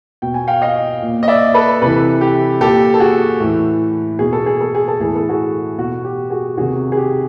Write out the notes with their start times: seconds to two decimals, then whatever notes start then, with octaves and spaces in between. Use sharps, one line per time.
0.22 B2 G5
0.34 G#5
0.48 F5 G5
0.62 D#5 F5
1.02 A#2
1.23 D#5
1.28 D5 E5
1.54 A4 B4
1.81 C3 E3 A4 B4
2.21 G4
2.60 A#2 G4 A4
2.94 A4
3.00 F#4 G#4
3.40 A2 E3
4.19 B2 G#4
4.33 A4
4.46 G#4
4.61 A4
4.75 G#4
4.88 A4
4.99 A2 E3 G#4
5.16 A4
5.29 F#4 G#4
5.78 B2 F#4
6.05 G4
6.30 F#4 G#4
6.57 C3 D#3 F#4 G#4
6.92 G#4
6.97 G4